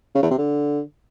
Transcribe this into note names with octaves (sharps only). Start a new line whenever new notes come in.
C#3
E2
C3
D3